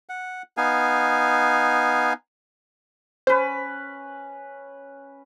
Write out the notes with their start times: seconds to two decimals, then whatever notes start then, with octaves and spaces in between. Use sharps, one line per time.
0.09 F#5
0.57 B3 D#4 F5 G#5
3.27 C#4 B4 C5